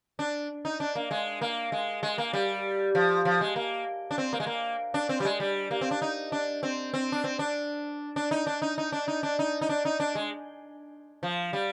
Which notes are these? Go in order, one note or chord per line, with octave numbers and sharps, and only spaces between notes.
D4
D#4
D4
A#3
G#3
A#3
G#3
G#3
A#3
G3
F3
F3
G#3
A#3
D4
C4
A#3
G#3
A#3
D4
C4
G3
G#3
G3
A#3
C4
D4
D#4
D4
C4
C4
D4
C4
D4
D4
D#4
D4
D#4
D#4
D4
D#4
D4
D#4
D#4
D4
D#4
D4
G#3
F3
G3